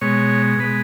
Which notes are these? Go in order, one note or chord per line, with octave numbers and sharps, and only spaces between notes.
B2 G#3 C#5
B2 G#3 B4